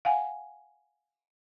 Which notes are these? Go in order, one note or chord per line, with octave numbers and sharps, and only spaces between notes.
F5 F#5 G#5